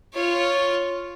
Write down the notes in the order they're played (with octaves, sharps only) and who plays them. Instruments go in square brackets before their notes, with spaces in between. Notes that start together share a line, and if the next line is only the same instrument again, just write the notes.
[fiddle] F4 C#5